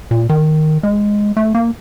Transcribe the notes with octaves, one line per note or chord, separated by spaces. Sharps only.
A#2
D#3
G#3
A3
A#3